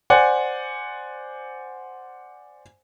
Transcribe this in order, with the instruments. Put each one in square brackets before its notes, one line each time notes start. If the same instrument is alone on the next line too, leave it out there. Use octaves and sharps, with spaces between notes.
[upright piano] C5 D5 F#5 G#5